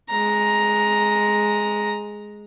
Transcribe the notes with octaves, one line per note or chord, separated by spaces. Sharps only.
G#3 A#5